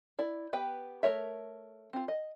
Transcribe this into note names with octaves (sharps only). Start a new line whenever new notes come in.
E4 D5
B3 G4 B4 G5
A3 A#4 C#5 E5
C4 F4
D#5